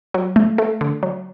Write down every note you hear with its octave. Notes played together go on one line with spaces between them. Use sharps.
F#3
A3
A3
D3
F#3